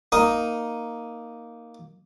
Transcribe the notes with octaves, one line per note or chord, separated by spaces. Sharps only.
A#3 D#4 D#6